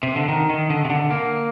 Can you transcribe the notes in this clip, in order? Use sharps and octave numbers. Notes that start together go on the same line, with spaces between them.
C3
D3
D#3
D#3
D3
C3
D3
A#3